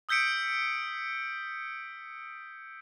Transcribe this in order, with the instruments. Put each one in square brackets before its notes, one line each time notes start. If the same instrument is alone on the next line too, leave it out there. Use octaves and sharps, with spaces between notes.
[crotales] D#6 E6 G6 B6 C#7 D7